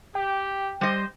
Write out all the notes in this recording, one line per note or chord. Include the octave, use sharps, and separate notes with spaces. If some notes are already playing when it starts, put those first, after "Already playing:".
G4 G5
G3 C5 D#5